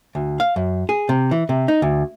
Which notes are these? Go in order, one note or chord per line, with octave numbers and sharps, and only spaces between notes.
D2
F5
F#2
G#4
C3
E3
C3
D#4
D2